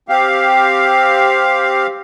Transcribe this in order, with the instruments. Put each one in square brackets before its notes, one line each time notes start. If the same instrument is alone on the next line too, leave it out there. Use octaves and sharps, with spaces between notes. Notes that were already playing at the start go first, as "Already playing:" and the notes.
[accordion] C4 G4 F5